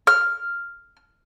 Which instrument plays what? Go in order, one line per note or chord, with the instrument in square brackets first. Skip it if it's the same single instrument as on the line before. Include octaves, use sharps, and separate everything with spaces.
[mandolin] F6